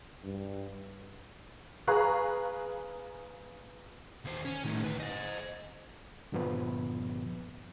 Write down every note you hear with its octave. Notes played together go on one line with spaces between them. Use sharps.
G2
G#4 B4 F5 A#5 C#6 F#6
D#2 C5
C#4
A2 D#3
D2 B4
C5 D#5
G2 A#2 D3 F3 B3 B4